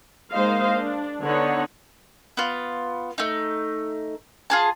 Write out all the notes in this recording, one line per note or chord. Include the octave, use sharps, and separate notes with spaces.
G#3 A#3 D#4 C5 D#5 F5
D4
D3 B3 D#4 C#5 F#5
B3 F4
A3 D#4
F4 G#4 A5